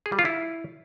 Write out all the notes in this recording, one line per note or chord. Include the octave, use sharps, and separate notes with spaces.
G#4
G3
F4
E4